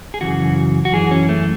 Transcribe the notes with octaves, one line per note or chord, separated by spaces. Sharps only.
G#4
F#2 C#3 E3 F#4
F#4
F#2 E3 G#4
C#4
A3